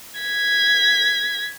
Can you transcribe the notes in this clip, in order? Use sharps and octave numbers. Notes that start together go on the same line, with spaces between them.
G#6 B6